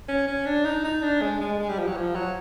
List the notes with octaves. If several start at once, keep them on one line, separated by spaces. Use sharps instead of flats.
C#4
C#4
D4
D#4
D#4
D4
G#3
G#3
G#3
G3
F3
F#3
F3
F#3